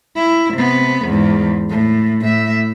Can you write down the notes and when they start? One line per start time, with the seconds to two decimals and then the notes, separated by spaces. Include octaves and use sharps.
0.16 E4
0.54 C3 B3
1.05 E2 G#2
1.69 A2
2.21 A2 E5